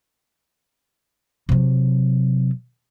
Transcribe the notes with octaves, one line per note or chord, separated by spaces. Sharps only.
C3 F#3